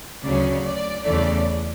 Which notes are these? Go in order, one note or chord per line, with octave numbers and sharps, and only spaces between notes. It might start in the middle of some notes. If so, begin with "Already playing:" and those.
D2 C#3 F#3 C#4 D5
D5
E2 C#3 E3 A3 D5